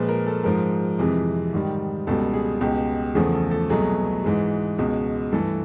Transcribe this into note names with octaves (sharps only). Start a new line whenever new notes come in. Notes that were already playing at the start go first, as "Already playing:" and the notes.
Already playing: A#2 F3 G#3 B4
A#4
A4
G#2 F3 G#3 A#4
F2 C3 E3 G#3
G#2 D#3 G3
C#2 B2 G3 A4
G#4
C#2 B2 G#3 G4
E2 C#3 F3 A3 G#4
A4
A4
C2 B2 F#3 A3 G#4
G#2 E3 G#3
C#2 B2 G#3
G2 E3 A3 A4